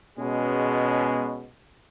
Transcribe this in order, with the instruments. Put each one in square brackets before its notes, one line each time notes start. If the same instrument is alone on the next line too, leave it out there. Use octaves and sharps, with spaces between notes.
[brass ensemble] B2 G#3 C#4